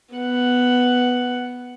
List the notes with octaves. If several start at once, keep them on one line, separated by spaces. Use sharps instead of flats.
B3 F#5